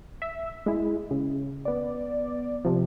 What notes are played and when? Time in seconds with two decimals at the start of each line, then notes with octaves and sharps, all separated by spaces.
0.22 E5
0.66 G#3 E4
1.11 C#3
1.65 B3 D5
2.65 C3 F3